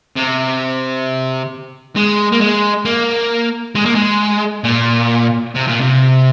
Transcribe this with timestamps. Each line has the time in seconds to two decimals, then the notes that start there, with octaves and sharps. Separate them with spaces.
0.16 C3
1.96 G#3
2.32 A#3
2.41 G#3
2.85 A#3
3.75 G#3
3.86 A#3
3.95 G#3
4.64 A#2
5.55 C3
5.67 A#2
5.81 C3